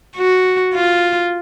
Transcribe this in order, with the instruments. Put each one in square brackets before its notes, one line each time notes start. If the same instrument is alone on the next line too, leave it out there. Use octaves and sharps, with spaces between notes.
[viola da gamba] F#4
F4